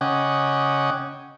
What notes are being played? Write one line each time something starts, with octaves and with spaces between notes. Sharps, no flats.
C#3 C#4 D#5 F#5 G5 D6